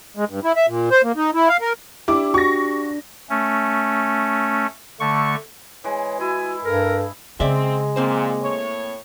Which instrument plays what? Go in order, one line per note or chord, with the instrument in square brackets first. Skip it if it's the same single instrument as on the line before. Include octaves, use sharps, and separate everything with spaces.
[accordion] G#3
G2
E4
E5
A#2
C5
A#3
D#4
E4
F5
A#4
[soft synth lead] D4 [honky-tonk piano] E4 [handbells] G4 [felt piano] D6
[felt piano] F#4 [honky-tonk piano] C#6 A#6
[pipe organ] A3 C#4
D3 A3 C#6
[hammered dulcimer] E3 G#3 [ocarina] C#5
[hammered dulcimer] E4 [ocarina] F#4 [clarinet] G#5
[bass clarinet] G2 [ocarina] A4 [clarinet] A#4
[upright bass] C#3 [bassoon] G#3 [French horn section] C4 [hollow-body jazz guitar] D5 E5
[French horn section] A#2 [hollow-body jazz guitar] A#3 C4 C5
[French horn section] A2 C#5